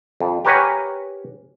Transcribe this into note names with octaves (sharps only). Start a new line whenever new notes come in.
F2
G4 A#4 B4 C#5 F#5 G#5